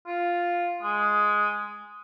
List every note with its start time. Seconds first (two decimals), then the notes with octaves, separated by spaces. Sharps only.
0.07 F4
0.83 G#3